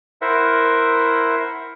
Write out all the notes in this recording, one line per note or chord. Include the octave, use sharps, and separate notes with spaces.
E4 A#4 C5 E5 F#5